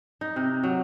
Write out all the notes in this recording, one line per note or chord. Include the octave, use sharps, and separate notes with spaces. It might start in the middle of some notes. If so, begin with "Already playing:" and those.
D#4
C3
F#3